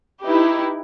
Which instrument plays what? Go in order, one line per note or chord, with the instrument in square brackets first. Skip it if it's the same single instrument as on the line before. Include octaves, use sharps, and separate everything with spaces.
[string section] D#4 E4 G4 B4